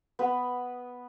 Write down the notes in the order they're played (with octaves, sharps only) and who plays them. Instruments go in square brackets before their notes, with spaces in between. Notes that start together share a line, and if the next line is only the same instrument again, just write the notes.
[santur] B3 B4